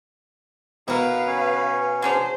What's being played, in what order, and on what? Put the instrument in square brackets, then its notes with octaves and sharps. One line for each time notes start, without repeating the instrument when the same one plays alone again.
[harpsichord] B2 [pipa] E4 A#4 [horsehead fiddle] B4 F5
[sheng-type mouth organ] C#4
[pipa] F#3 C#4 D4 [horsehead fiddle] G#4 C5